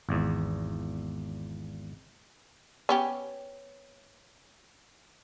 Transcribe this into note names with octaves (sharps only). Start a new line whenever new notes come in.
G#1 E2
B3 C#4 G4